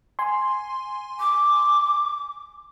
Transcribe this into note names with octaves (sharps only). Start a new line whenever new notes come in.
G#5 C6
D6